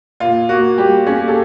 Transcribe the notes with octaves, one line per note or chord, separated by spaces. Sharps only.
A#2 F4
A#3 F#4
G3 G4
C#4 G#4
A4